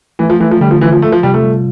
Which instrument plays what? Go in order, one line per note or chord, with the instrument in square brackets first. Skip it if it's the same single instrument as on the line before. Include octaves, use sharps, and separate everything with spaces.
[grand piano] E3 [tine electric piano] A3
[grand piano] F3
[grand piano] E3 [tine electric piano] A3
[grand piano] F3
[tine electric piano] D3 [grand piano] G3
[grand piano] F3
[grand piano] E3 [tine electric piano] F4
[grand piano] F3
[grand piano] A3 [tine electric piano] F4
[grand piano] F3
[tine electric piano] C3 [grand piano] G3
[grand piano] A3
[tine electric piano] G3